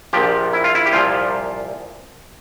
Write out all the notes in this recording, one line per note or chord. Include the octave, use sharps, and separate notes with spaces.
A#1 A#2 F3 G4
E4
F4
E4
G4
C2 A#2 F3 F4